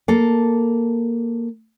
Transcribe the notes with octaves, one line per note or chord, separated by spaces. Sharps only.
A#3 A4